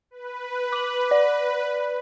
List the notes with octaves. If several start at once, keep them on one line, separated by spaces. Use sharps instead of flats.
B4
D6 F#7
D5